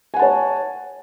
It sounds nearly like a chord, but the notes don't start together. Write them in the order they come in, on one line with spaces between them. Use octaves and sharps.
G#5 F#5 A5 C#5